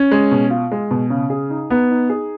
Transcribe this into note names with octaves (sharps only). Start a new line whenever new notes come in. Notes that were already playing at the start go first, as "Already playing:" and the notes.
Already playing: C#4
G#3
B2
F4
G#3
B2
C#3
G#4
D#4
B3 D#4
D#4
G#4